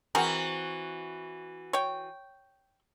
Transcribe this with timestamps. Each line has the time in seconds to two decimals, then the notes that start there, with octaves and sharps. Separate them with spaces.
0.15 E3 C4 F#4 G#4 A#4
1.73 C#5 G5